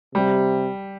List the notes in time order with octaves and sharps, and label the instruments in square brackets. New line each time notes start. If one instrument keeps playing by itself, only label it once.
[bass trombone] C3 [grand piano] G3